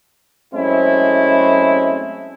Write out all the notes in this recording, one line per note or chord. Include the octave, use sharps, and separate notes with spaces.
F#2 G#3 A3 C4 C#4 E4